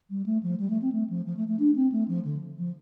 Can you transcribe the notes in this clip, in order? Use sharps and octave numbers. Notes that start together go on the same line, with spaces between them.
G3
A3
F3
G3
A3
C4
A3
F3
F3
A3
A3
D4
C4
A3
F3
D3
F3